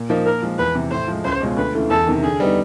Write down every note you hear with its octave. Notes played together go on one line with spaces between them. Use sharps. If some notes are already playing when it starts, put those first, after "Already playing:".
Already playing: A#2
F3 A#3 D#4
A#2 A#4
F3 G#3
E2 B4
C3 E3
A2 C5
F3 G#3
C#2 C5
B2 G#3 C#4 F4
D2 B4
C#3 E3 A3
E2 A4
C3 D#3
D3 G#4
G3 B3 D#4